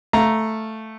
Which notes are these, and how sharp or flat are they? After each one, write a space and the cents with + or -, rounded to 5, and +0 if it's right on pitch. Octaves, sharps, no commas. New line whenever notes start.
A3 +0 F5 +0 A#5 +0